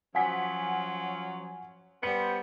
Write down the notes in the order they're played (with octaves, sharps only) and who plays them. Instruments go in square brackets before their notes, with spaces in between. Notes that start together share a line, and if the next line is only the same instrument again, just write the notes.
[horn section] F3 F#3 C#4 [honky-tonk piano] F#5 G#5 B6
[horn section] G3 B3 C5 [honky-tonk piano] C#7